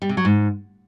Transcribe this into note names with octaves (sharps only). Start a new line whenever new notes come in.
G3
C3
F#3
G#2